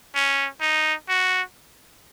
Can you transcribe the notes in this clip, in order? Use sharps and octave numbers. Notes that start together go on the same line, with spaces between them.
C#4
D#4
F#4